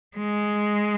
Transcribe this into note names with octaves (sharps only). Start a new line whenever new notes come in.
G#3